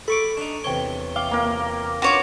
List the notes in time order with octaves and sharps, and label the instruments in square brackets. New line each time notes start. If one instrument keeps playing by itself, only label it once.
[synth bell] A4 [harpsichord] B5 C#6 D6
[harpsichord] D4 D#4
[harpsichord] E2 C3 C#5 [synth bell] G5 G7
[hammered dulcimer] F5 [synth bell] G5 D6 G7
[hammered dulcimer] A#3 A#4
[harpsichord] D4 F4 [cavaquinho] F#4 C#5 D6